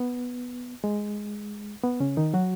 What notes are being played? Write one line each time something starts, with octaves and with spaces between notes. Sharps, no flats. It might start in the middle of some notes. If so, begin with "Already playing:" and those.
Already playing: B3
G#3
B3
C#3 C#4
D#3 D#4
F#3 F#4